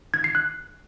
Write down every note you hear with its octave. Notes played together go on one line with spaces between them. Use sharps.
G#6
C7
F#6